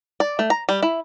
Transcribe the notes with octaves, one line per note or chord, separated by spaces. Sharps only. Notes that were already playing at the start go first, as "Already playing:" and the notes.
D5
A3
A#5
G3
E4